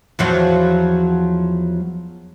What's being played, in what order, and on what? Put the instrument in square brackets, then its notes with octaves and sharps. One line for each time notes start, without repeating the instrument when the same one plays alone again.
[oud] E2 F3 F#3